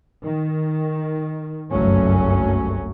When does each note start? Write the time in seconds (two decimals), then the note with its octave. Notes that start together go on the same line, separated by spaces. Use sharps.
0.23 D#3
1.71 F#1 C2 G2 F#3 A3 C#4